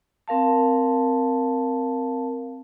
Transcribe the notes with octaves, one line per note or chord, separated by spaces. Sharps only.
C4 A#4 F5 A5